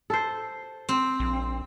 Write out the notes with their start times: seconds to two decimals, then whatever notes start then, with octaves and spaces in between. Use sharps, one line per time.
0.10 A4 C5
0.89 C4
1.20 A#1